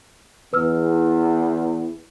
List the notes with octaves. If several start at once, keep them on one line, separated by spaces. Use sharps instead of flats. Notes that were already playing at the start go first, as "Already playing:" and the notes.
E2 B4 E6 F6